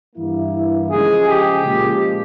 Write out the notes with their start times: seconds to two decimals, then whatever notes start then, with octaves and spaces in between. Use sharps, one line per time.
0.16 G2 E3 A#3 E4
0.91 C#3 F3 G#3 G#4
1.29 G4
1.66 A#2 F3 G#3